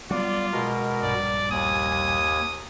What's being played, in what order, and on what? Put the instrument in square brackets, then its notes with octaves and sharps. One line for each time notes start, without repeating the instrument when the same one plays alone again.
[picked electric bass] F#3 G3 B3 [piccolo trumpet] F4 [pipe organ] D5
[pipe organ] B2 A#4 [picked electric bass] G#3
[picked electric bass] A#1 G2 [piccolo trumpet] D5
[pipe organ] D#2 G#5 [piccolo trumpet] D#6